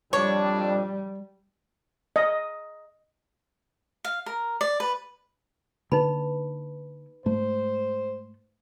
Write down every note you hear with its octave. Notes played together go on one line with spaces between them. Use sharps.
F2 G3 D4 C#5
D#5
F5
A#4
D5
B4
D3 A#3 D#4 B4 B5
G#2 A3 C5